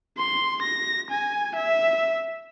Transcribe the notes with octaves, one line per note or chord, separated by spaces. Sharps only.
C6
A#6
G#5
E5